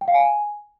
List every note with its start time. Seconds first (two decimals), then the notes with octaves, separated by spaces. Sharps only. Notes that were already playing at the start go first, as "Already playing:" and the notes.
0.01 G5
0.08 F5
0.14 G#5